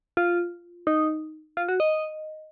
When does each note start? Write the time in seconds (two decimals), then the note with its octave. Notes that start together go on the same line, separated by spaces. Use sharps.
0.17 F4
0.87 D#4
1.57 F4
1.68 F#4
1.80 D#5